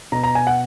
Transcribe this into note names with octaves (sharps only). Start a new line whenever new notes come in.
B2 A#5
A#5
G#5
F#5